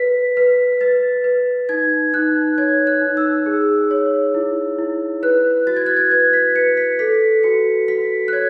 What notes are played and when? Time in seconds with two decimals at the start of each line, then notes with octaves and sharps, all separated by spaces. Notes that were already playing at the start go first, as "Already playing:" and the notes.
Already playing: B4 B6
0.37 B4 B6
0.81 B4 A6
1.24 B4
1.69 D#4 G#6
2.13 D#4 F#6
2.58 C#5 G#6
2.87 F#6
3.01 D#4
3.17 E6
3.46 G#4
3.91 C#5
4.34 E4
4.78 E4
5.23 B4 F#6
5.67 F#4 A6
5.76 G#6
5.86 F#6
5.97 G#6
6.11 B4 G#6
6.33 B6
6.55 B4 C#7
6.77 B6
6.99 A4 B6
7.43 F#4 C#7
7.88 F#4 B6
8.28 F#6
8.33 C#5 G#6